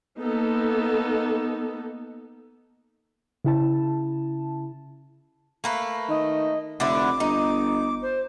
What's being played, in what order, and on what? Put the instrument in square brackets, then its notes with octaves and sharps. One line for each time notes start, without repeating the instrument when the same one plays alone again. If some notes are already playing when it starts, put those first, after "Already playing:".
[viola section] A#3 B3 D#4 A4
[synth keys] C#3 E4 A5
[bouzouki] A3 A#3 B4
[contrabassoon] D#3 [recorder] D#5
[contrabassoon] F1 [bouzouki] D3 D4 E4 [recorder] D6
[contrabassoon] G1 [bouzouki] D#4
[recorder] C5